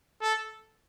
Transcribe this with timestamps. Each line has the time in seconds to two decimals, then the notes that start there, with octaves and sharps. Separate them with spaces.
0.22 A4